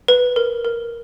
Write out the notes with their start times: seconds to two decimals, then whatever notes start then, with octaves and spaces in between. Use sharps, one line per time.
0.08 B4
0.36 A#4
0.65 A#4